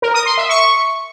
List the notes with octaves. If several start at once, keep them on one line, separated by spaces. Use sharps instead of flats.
A#4
D#6
C6
E5
C#6